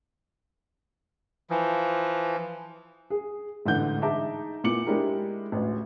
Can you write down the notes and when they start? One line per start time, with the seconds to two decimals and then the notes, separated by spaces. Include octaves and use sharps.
1.50 E3 F3
3.10 G#4
3.66 A1 G#2 D3 E3 F#5 G6
4.02 D#4 G#4 E5 A5 A#5 D6
4.64 A#2 B3 E4 D6 C#7 F#7
4.86 G#3 D4 E4 G4 A#4
5.52 A1 D2